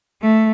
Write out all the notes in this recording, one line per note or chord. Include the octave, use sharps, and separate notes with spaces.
A3